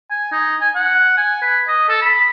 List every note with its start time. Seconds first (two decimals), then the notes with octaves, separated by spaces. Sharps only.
0.11 G#5
0.32 D#4
0.61 G#5
0.75 F#5
1.17 G#5
1.42 B4
1.68 D#5
1.89 A4
2.02 B5